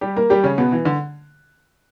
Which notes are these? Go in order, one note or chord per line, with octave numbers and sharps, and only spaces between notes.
G3 G4
A#3 A#4
G3 G4
C#3 C#4
B2 B3
E3
D3